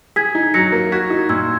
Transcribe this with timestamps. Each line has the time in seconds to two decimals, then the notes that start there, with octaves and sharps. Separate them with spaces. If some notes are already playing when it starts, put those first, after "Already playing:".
0.16 G#4 G#6 B6
0.35 D#4
0.54 F#3 A#6 C#7
0.72 A#3
0.92 F#4 G#6 B6
1.10 D#4
1.29 A#2 E6 G#6